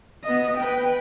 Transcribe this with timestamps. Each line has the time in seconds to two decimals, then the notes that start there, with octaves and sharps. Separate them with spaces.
0.24 B3 D#5
0.57 B4 G5